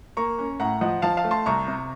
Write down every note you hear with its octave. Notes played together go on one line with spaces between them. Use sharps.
A#3 A#5 C#6
C#4
A2 F#5 A#5
F3 D#5 F#5
F3 F5 A5
F5 A5
A3
A5 C6
C2 A#5 C#6
C3